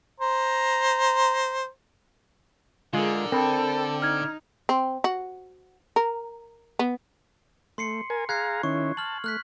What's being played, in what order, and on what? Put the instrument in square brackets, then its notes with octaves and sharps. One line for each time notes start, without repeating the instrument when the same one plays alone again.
[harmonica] C5 A#5
[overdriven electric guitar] D3 [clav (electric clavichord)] G#3 F4 [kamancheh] G#4 A#4
[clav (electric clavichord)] C4 [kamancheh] A4 G5 [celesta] A#4 C5 B5
[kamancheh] D#4 [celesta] F6 G#6
[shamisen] C4
F#4
A#4
B3
[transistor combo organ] A3 [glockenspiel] C6 C7 C#7
[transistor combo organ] A#4 G#5
[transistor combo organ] G#4 F5 A#5 [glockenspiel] F#6 G#6 C7
[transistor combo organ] D#3 C#4 E4 [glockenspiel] C#6
[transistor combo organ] A5 [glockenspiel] F6 F#7
[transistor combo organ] A3 [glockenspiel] F6 F#6 B6